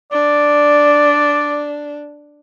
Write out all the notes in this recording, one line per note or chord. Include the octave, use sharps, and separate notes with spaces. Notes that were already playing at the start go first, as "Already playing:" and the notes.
D4 D5